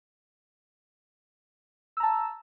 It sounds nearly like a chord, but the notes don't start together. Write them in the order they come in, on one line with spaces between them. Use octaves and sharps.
E6 A#5 A5